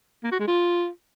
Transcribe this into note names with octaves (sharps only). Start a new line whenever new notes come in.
A#3
F#4
G#3
F4